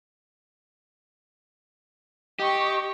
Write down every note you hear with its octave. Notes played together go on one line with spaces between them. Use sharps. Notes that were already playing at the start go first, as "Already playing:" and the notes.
G4 D#5 C#6